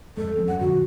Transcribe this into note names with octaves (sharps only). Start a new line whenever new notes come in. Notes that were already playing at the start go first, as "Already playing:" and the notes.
F2 G#3 A4
F3 C4
F#2 F#3 C#4 F#5
F2 A#2 D3 F#4